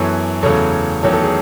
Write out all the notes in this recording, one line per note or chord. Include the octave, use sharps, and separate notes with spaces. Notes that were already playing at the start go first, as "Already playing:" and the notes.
Already playing: F#2 E3 B3 A4 C#5
E2 C#3 F#3 A3 A4 C#5
E2 D#3 F#3 A3 A4 C#5
A4
G#4